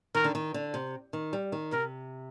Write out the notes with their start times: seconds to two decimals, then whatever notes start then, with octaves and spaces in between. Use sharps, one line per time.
0.15 D#3 A#4
0.24 D3
0.35 D#3
0.54 D3
0.74 C3
1.13 D#3
1.33 G3
1.52 D#3
1.72 C3 A#4